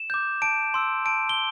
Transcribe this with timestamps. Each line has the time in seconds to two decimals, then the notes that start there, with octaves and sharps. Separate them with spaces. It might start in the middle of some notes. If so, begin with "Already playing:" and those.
Already playing: E7
0.10 D6 G6
0.42 A5 D7
0.74 C6 E6
1.05 A5 D7
1.29 G7